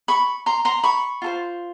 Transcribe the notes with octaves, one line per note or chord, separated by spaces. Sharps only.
B5 C#6
A#5 C6
A#5 C6
B5 C#6
F4 A4 C5